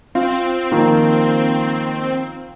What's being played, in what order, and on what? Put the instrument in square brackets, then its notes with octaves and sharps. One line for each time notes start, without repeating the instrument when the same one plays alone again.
[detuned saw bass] C4 [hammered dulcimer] F4
[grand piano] D#3 F3 A#3